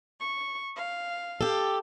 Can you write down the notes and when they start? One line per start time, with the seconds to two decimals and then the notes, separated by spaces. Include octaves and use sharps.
0.21 C#6
0.76 F5
1.41 G4 A4